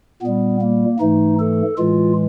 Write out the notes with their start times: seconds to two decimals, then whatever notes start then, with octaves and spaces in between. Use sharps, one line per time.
0.22 A#2 G3 B3
0.61 A#3
1.00 G#2 E3 A3 D#4
1.39 A4
1.78 A2 E3 G#3 F4